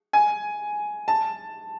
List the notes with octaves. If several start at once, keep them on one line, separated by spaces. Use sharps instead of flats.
G#5
A5